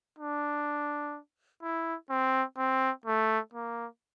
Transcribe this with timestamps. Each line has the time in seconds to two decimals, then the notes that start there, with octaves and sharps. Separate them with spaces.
0.19 D4
1.62 E4
2.10 C4
2.57 C4
3.05 A3
3.53 A#3